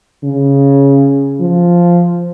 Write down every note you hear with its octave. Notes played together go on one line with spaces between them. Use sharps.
C#3
F3